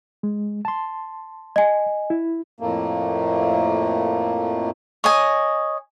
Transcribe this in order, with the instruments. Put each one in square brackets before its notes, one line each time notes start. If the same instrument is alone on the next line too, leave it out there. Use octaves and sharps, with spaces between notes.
[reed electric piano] G#3
A5 C6
[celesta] D#5 G#5
[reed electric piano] E4
[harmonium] F2 A2 A3 A#3
[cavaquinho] C#5 D#5 G#5